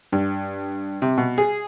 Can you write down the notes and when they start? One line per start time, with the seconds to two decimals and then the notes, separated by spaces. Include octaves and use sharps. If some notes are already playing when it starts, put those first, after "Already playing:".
0.12 G2
1.02 C3
1.18 B2
1.38 G#4